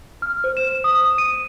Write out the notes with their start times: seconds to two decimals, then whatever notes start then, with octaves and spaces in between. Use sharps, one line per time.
0.22 F6
0.44 C5
0.57 E7
0.84 D#6
1.18 D#7